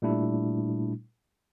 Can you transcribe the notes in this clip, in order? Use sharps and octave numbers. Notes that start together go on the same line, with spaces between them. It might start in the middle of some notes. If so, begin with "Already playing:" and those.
A#2 G3 A3 D4 E4